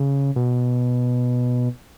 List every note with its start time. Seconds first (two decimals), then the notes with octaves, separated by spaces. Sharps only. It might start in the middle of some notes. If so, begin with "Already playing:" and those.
Already playing: C#3
0.36 B2